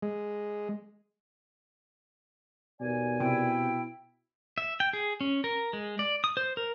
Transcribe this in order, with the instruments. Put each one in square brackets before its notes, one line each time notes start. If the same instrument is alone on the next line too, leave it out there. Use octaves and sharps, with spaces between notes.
[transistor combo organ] G#3
[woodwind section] D#2 D5 G#5 [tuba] B2
[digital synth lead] C3 [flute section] E4 G5
[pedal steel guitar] E5
G5
G#4
C#4
A#4
G#3
D5
D#6
C5
A#4